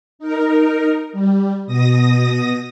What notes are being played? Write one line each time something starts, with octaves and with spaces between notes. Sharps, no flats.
D#4 A#4
G3
B2 D#6 A#6